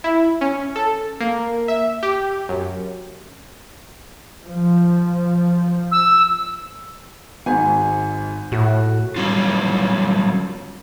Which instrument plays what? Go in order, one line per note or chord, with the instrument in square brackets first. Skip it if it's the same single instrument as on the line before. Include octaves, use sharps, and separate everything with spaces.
[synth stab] E4
C#4
A4
A#3
E5
G4
F#2
[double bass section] F3
[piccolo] E6
[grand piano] G#1 G#2 G#5
[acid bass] A2 [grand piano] F#4
[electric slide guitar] F#3 G3 C#4 D#4 F4